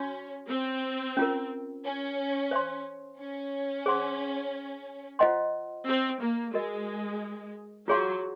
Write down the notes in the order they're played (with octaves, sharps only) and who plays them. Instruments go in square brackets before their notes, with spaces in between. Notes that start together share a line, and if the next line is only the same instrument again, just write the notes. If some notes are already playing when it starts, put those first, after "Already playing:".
Already playing: [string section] C#4 [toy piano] F#4 C#5 C6
[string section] C4
[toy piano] C#4 F4 A#4
[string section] C#4
[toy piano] C5 F5 C6
[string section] C#4
[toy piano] G#4 C5 F#5 C6
F4 C5 D#5 F#5 C6
[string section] C4
A#3
[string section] G#3 [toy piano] F#4 A#4 D#5
[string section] F#3 [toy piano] F4 G#4 C#5 F5 C6